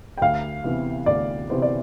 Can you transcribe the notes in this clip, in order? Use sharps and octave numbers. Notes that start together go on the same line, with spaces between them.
G5
D2 F5
C3 E3 B3
D2 D5
C3 E3 B3 C5
D5